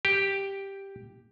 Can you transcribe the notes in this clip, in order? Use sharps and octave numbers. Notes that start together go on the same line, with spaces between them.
G4